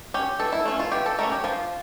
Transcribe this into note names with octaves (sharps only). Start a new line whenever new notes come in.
C#4 G4
E3 A4
E4
A3 C#4 F4
F4
E3 G4
A4
A3 C#4 A#4
G4
F3 F4